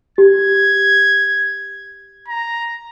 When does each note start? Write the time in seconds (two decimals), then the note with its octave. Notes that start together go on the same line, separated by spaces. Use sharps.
0.18 G4 G#6
2.28 A#5